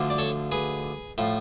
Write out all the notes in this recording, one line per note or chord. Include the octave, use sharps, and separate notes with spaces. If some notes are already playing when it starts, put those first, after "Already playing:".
Already playing: D2 D3 F3
D5
A4 C#5
G#4 B4
A2 F3